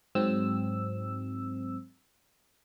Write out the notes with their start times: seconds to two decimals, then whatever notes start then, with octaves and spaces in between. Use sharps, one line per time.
0.15 G#2 F#3 C4 E6